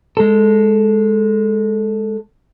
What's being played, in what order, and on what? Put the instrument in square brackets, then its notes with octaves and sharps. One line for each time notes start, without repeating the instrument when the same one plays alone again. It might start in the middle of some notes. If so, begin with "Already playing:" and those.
[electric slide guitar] G#3 A4